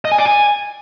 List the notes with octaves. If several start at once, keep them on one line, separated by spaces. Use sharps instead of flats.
D#5
G#5
D5
G#5